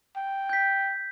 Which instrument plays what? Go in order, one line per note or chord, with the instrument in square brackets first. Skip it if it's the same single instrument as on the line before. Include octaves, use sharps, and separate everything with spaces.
[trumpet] G5
[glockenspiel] G6 B6